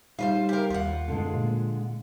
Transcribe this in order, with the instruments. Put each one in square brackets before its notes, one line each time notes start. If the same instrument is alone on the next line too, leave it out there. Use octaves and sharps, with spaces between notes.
[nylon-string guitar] G3 [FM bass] D#4 [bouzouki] F4 B4 C5
[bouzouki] G4 A#4
[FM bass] D#2 [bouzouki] F4 F#5
[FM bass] F#2 [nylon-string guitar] D3 G#3
[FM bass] A#2